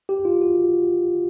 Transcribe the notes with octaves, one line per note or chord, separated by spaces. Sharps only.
G4
F4
F#4